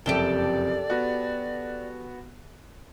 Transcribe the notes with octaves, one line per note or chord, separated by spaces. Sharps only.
F#1 F2 C3 G4 A4 D5 G5
B3 F#4